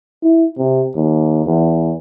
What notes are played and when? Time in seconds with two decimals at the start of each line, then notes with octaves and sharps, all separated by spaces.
0.22 E4
0.57 C3
0.95 D#2
1.45 E2